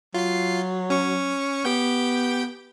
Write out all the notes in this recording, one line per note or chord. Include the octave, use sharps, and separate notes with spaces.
F#3 F4 C7
C#4 C#6
B3 G4 G5 G6